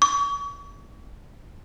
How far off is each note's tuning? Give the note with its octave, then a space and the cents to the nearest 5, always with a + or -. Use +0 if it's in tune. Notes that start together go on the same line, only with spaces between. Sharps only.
C#6 +40